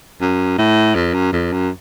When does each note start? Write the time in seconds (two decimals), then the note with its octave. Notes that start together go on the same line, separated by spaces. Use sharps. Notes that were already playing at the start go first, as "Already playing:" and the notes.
0.21 F#2
0.58 A2
0.95 F2
1.14 F#2
1.32 F2
1.52 F#2